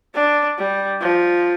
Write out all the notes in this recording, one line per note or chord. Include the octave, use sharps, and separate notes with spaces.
D4
G3
F3